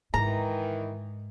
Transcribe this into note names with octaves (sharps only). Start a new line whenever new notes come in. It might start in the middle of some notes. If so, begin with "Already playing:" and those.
G#2 D#3 E3 A#5